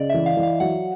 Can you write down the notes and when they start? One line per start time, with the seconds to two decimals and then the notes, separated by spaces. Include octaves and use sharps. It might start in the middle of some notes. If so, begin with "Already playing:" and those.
Already playing: C#3 D5 D#5
0.09 E3 E5
0.26 F5
0.37 E3
0.43 F5
0.60 F#3 F#5